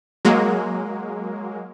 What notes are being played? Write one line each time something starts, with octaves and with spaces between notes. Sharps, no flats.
F#3 G#3 A#3